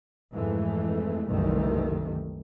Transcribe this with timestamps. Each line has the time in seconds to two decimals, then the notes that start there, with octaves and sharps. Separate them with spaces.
0.34 F2 G#2 E3 G#3 A3
1.28 F#1 C2 D#3 E3 G3 A3